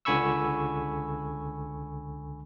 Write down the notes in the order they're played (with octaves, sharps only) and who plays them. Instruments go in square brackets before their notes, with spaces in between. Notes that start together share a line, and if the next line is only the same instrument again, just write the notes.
[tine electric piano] C#2 D3 G#5 B5 C#6 E6